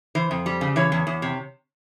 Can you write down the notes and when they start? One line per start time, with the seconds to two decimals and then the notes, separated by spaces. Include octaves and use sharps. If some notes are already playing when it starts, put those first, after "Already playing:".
0.15 E3 C5
0.31 F2
0.46 G3
0.61 C#3
0.76 E3 C#5
0.92 E2
1.07 E2
1.22 C3